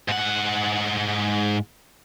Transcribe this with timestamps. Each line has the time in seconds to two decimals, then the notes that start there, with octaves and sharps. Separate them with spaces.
0.09 G#2 F#5